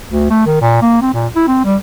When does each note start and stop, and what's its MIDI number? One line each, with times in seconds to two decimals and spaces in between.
0.11 0.27 38
0.30 0.41 57
0.46 0.58 51
0.61 0.78 46
0.82 1.01 58
1.02 1.11 60
1.14 1.27 46
1.36 1.43 64
1.47 1.63 60
1.64 1.76 55